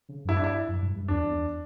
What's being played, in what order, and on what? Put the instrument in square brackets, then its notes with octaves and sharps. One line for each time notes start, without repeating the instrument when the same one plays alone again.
[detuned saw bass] C#3
F#2
[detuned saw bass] G2 [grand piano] E4
[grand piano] D4
E4
[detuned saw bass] F#2
G2
G2
[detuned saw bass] E2 [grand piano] D4